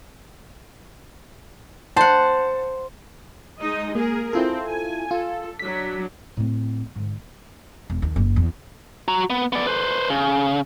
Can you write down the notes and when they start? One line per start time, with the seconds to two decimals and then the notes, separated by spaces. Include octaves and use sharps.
1.96 C5 F#5 A5
3.59 G#3 D#4 D#5
3.95 A#3 G#4 A#4
4.33 C4 E4 F4 A4
4.67 G#5
5.11 F4 A4
5.59 F#3 D4 B6
6.37 A2 C4
6.95 G#2 D3
7.90 E1
8.02 D#2
8.16 F#1
8.36 E2
9.08 F#4 A#5
9.30 B3
9.53 B3 D5
9.67 B4 C5
10.10 C#3